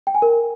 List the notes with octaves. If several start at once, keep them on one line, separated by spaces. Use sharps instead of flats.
G5
G#5
A#4